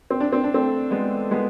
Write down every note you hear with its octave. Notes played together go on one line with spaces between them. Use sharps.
C4
D4
C4
D4
A3 C4
G#3 B3
G#3 B3